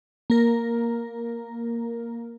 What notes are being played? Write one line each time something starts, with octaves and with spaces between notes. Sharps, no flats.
A#3 A#4